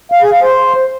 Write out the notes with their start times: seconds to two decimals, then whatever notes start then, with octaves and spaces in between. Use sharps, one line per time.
0.12 F5
0.22 G#4
0.32 F5
0.42 C5